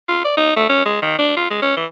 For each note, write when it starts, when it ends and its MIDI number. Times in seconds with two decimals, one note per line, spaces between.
0.08 0.23 65
0.25 0.32 74
0.37 0.55 63
0.56 0.65 57
0.69 0.83 61
0.86 1.01 56
1.02 1.17 51
1.19 1.33 62
1.37 1.48 65
1.51 1.61 56
1.62 1.76 61
1.77 1.86 52